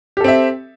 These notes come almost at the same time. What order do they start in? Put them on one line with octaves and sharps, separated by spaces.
G4 A4 C4 E5